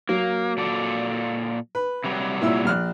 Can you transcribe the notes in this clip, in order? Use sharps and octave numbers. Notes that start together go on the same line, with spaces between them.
F#3 A#3
A#2 A4 D5
B4
C3 F#3 G3
A#2 E4 E6
A#1 F6 F#6